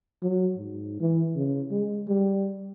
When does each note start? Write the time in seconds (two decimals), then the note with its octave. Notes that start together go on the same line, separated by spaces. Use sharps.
0.23 F#3
0.57 G#2
1.00 E3
1.36 C#3
1.71 G#3
2.08 G3